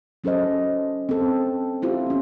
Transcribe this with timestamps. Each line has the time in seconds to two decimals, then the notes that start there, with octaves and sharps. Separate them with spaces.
0.24 F#3 C#4 A4 C5 D#5
1.09 C4 A4
1.82 C4 E4 F4 G4 C5
2.06 B3 C#4